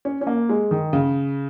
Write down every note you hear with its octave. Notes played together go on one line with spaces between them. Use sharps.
C#4
C#4
A#3
G#3
D#3
C#3